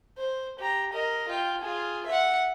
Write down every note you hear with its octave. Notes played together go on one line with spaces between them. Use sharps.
C5
G4 A#5
A#4 D#5
F4 G5
F4 G#4
E5 F#5